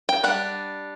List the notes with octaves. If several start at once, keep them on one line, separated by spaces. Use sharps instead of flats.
G5
G3 D4 F#5